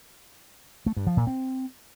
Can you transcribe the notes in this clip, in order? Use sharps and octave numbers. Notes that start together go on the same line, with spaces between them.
A3
G2
F3
A#2
C4